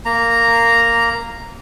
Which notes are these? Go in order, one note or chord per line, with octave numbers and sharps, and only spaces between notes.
A#3 A#5